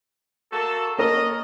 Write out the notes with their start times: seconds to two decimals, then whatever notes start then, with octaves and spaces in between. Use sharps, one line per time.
0.52 A#3 F#4 A4
0.98 A#3 C#4 A#4 D#5